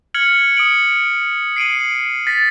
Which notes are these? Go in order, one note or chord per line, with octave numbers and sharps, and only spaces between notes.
F6 G#6 C#7 F#7
D#6 C#7 D7 F#7
C7 D7 D#7 F#7
A6 B6